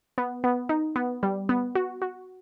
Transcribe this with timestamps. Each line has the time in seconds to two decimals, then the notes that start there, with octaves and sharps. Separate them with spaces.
0.18 B3
0.44 B3
0.69 D#4
0.96 B3
1.23 G3
1.49 B3
1.75 F#4
2.02 F#4